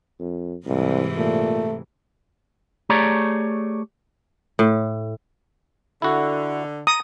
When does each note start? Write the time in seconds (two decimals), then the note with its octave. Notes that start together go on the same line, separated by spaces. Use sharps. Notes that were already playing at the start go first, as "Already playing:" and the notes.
0.20 F2
0.66 C2 G#2 C3 E3
1.17 A#2 A3
2.89 A3 G4 G#4 C#5 D5 A#5
4.59 A2
6.02 D3 E4 F#4
6.87 A#5 D#6